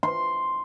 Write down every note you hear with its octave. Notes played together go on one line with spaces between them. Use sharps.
C6